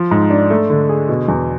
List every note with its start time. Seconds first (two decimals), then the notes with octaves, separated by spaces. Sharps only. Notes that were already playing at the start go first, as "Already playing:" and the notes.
Already playing: F3
0.11 G#2
0.30 D4
0.50 A3
0.70 D3
0.89 G#4
1.09 B2
1.28 E2